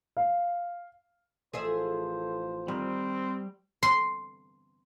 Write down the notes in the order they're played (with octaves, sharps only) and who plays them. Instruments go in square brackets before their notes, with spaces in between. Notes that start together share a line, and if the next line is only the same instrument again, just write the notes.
[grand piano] F5
[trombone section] A1 F3 C5 [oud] G#4 A4 E5
[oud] D#3 [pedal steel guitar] G3 [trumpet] C4
[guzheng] C6